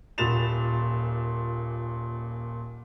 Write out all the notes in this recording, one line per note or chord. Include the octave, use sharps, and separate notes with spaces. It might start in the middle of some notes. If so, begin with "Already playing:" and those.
D#1 A#2 B5 A6 E7 F7